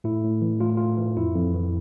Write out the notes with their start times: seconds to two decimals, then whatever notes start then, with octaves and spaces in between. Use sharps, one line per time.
0.04 A2 E4
0.24 A2
0.42 E3
0.60 A2 F4
0.77 A2 F4
0.98 E3
1.17 F2 E4
1.35 F2
1.53 E3